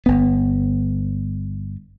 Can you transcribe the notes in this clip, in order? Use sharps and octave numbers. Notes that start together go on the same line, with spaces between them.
G1 B3